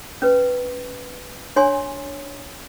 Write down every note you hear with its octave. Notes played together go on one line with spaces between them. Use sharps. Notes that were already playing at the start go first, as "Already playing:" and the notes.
C#4 B4
D4 C#5 G#5 C6